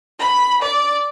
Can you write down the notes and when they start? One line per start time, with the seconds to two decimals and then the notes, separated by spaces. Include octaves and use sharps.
0.19 B5
0.61 D5